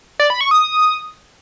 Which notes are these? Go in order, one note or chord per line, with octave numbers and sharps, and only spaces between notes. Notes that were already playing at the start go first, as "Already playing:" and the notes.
D5
B5
C#6
D#6